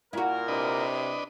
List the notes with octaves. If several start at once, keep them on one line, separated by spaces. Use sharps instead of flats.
A#2 E4 F#4 A#4
C3 D4 B4 D#5